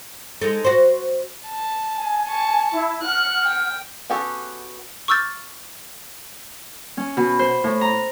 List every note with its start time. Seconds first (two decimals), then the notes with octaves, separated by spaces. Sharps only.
0.41 G#3 D#4 A4
0.65 F#4 C5
1.47 A5
1.98 G#5
2.28 A5 C#6
2.72 E4
3.03 F#5 F6 F#6
3.44 G5
4.10 B3 C#4 F#4 G4 A4
5.08 C#6 D6 E6 F6 G6 A6
6.97 C#4
7.17 B2
7.39 C5
7.64 A2
7.81 A#5